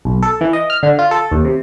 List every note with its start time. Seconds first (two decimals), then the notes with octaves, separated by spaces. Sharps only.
0.05 B1
0.22 A4
0.41 E3
0.53 D#5
0.70 F6
0.83 D3
0.99 F4
1.11 A4
1.32 D#2
1.45 C3